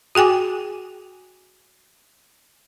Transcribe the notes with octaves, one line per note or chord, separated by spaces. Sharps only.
F#4 G#4 G5 G#5 D6